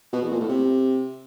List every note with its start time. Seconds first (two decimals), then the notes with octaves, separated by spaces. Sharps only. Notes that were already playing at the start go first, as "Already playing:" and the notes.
0.13 B2
0.22 E2
0.31 A#2
0.40 A2
0.49 C3